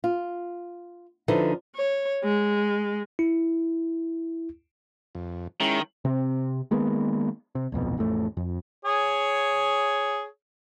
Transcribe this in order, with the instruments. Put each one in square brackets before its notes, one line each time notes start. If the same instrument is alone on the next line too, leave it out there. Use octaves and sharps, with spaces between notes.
[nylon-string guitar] F4
D3 F3 D#4 E4 A4 B4
[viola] C#5
G#3
[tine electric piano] E4
[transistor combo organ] F2
[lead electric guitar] D#3 [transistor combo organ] G#3 C#4 E4
[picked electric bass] C3 C4
D#3 G#3 A#3 B3
C3
D1 C2 F2 B2
A1 F2 A3
F2
[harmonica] G#4 C#5